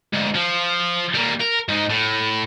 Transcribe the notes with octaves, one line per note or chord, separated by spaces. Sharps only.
D2 G#2
F3
G3 A#3
A#4
G#2 D#4
A2